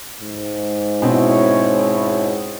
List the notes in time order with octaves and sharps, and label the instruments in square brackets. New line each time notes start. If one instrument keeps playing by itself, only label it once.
[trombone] G#2
[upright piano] B2 C4 [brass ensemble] C#4 E4 C#5